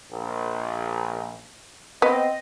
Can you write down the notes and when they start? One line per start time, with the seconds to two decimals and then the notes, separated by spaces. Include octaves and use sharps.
0.11 A#1
2.02 B3 C4 D#5